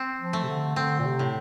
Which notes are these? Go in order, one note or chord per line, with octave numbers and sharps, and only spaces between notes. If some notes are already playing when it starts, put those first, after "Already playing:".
Already playing: C4
F3
A3
C3
D3
D3 C4
A#2
C3
A2